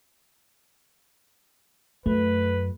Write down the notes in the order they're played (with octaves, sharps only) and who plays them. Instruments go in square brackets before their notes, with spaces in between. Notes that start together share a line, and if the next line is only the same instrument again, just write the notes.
[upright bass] F#2 [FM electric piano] A3 [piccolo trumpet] B4